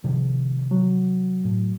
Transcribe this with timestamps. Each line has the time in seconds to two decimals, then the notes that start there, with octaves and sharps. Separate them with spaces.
0.04 C2 C3 D#3 F3
0.71 F#3
1.45 A2